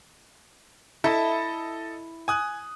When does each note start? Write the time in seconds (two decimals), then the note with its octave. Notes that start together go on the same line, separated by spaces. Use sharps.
1.04 E4 A4 D#5 A5
2.28 G#5 D#6 F#6